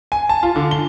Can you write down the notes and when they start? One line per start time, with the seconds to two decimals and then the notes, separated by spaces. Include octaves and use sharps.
0.12 G#5
0.29 A5
0.43 F4
0.56 D3
0.71 G7